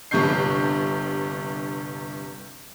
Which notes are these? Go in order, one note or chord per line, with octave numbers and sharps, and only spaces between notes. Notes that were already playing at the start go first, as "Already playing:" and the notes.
G1 G2 C3 C#6 G6 C7